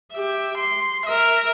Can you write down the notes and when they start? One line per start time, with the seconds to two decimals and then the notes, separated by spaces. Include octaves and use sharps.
0.12 G4 E5
0.57 C6
1.06 A#4 E5